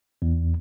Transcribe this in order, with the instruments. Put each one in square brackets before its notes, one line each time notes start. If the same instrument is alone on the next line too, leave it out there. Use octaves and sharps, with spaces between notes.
[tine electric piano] E2